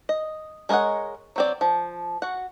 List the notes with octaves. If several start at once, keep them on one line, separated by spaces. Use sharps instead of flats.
D#5
G#3 A#4 C#5 D#5 F#5
F#3 C4 D5
F3
F#4 F#5